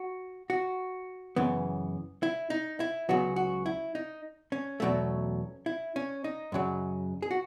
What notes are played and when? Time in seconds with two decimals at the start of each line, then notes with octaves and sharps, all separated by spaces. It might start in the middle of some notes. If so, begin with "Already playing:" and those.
Already playing: F#4
0.50 F#4
1.36 F#2 C#3 E3 B3
2.23 E4
2.50 D#4
2.80 E4
3.09 C#2 C#3 F#3 B3 F#4
3.36 F#4
3.66 E4
3.95 D#4
4.52 C#4
4.80 E2 B2 F#3 A3
5.66 E4
5.96 C#4
6.24 D#4
6.52 F#2 C#3 F#3
7.22 G#4
7.31 F#4